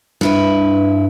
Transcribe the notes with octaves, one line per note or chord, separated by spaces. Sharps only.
G2 E4 B4